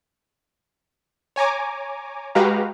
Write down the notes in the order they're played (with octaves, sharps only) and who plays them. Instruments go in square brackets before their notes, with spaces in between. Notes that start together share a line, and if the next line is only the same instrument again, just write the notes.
[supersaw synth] C#5 G#5 A#5 D6
G#3 F#4 G4 B4 F5 A#5